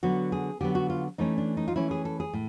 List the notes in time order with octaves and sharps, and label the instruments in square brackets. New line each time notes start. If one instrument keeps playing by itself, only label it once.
[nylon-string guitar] D3 F#3 B3 F#4
G#4
D3 F#3 B3 G4
F#4
F4
E3 A3 C#4 D#4
D4
D#4
F4
E3 A3 C#4 E4
G#4
A4
G#4
A2